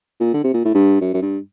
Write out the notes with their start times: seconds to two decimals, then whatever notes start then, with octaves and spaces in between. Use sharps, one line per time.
0.20 A#2
0.34 D3
0.44 C3
0.54 A#2
0.65 A2
0.74 G2
1.01 F#2
1.14 F#2
1.21 G2